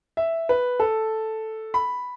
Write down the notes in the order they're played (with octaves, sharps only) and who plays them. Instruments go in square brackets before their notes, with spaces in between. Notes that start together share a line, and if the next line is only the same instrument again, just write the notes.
[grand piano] E5
B4
A4
B5